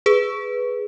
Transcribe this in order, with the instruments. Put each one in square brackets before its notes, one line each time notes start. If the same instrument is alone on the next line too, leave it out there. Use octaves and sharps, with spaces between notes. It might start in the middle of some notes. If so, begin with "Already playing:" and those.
[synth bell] G#4 B4